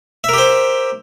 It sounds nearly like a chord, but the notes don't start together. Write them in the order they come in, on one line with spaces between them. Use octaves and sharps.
E5 A#4 G4 C5